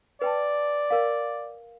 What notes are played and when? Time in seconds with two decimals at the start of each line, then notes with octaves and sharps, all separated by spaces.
0.22 B4 D5 G5 A5
0.90 A#4 F5